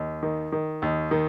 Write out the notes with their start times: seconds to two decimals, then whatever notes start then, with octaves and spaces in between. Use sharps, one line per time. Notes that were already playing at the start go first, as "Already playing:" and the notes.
Already playing: D#2
0.23 D#3
0.52 D#3
0.82 D#2
1.11 D#3